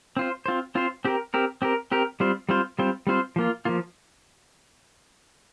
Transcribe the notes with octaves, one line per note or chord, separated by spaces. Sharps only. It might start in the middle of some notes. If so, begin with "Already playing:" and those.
C4 F4 C5
C4 F4 C5
C4 F4 C5
C4 G4 A#4
C4 G4 A#4
C4 G4 A#4
C4 G4 A#4
G3 C4 F4 C5
G3 C4 F4 C5
G3 C4 F4 C5
G3 C4 F4 C5
F3 A#3 F4
F3 A#3 F4